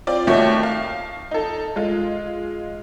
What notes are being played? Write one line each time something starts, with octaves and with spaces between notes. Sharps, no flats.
C4 F4 D5
D#2 D#3 A3 F#4 C#5
F5
D#4 A4
G#3 F4